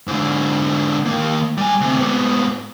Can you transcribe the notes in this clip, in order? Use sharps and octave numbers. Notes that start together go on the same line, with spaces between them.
G#2 D3
D#3 A#3
G3 G#5
D2 C3
G#2 B3